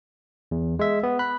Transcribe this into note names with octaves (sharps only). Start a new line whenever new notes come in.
E2
G#3 E5
B3
B5 F#6